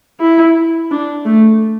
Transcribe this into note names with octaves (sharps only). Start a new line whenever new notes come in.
E4
D4
A3